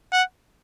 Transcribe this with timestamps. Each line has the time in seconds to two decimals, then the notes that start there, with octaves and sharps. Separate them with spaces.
0.12 F#5